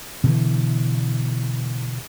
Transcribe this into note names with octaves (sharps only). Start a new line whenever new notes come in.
B2 D3 E3